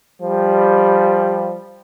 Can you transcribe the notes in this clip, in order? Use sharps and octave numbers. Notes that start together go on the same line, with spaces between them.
F3 G3